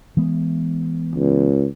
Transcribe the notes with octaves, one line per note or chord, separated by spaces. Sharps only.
E3 G#3 B3
C#2